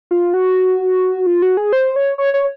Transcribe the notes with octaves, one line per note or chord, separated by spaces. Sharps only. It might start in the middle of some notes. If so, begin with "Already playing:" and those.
F4
F#4
F4
F#4
G#4
C5
C#5
C#5
C#5